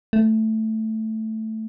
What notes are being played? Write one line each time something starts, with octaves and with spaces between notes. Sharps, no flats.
A3